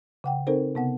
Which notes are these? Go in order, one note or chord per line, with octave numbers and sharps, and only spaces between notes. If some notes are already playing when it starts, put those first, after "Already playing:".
C#3 F#5 G5
C4 D#4 A4 A#4 C5
C3 B3 F#5